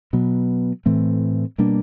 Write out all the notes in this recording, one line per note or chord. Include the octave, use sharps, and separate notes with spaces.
B2 F#3 B3
A2 E3 A3 C4
B2 G3 A#3 D4